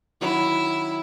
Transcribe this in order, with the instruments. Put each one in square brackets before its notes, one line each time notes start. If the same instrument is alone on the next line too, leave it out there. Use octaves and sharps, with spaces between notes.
[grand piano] D#3 F#3 C#4 F#4 C#5 [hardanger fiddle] E4